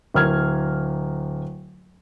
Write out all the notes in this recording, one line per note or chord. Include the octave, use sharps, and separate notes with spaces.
D1 A#4 F6 G#6